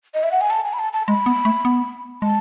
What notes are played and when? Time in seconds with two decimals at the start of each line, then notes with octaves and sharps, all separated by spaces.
0.14 D#5
0.24 E5
0.32 F#5
0.41 G#5
0.50 A5
0.65 G#5
0.73 B5
0.79 A5
0.93 A5
1.07 G#3 B5
1.26 B3
1.45 A3
1.65 B3
2.22 G#3 A5